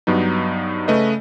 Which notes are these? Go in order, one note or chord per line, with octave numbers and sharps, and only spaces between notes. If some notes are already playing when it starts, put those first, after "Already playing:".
G2 F#3 B3 D#4
C#3 A3 B4 D#5